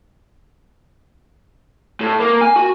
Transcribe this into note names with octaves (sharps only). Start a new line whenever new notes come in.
A2
A#3
G#5
F#4